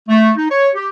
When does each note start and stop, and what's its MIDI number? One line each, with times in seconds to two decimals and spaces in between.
0.08 0.31 57
0.36 0.47 63
0.49 0.69 73
0.75 0.87 67